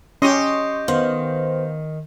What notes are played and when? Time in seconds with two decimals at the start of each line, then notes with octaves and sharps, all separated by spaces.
0.22 C#4 G4 D#5 C6 C#6
0.88 D#3 B3 C5 F5